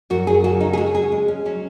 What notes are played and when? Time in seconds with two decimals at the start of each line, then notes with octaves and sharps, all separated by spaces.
0.10 F#2 F#4
0.27 G#4
0.44 C#3 F#4
0.61 D#4
0.73 G#4
0.77 G#3 F#4
0.95 G#4
1.12 G#3
1.28 C#4
1.45 F#3 C#4